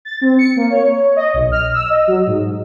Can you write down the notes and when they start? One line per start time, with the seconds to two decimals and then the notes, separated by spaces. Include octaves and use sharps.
0.05 A6
0.21 C4
0.39 C#7
0.56 A#3
0.70 C#5
1.16 D#5
1.34 B1
1.52 F6
1.74 E6
1.90 D#5
2.07 F#3
2.27 G#2